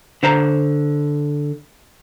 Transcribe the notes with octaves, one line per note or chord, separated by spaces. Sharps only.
D3 C5 A#5